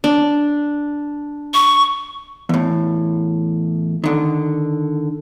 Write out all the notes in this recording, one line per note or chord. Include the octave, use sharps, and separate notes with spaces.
D4
C#6
E2 A2
D3 D#3